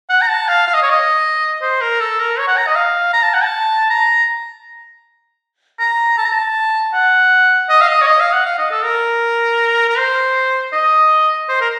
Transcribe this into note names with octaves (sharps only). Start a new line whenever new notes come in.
F#5
A#5
A5
F5
F5
D#5
C#5
D#5
C5
A#4
A4
A#4
C#5
F#5
A#5
D#5
F5
A#5
A5
F#5
A5
A#5
A#5
A5
A#5
A5
F#5
D#5
F5
D#5
C#5
D#5
F5
F#5
F5
D#5
A4
A#4
A#4
C5
D#5
C5
A#4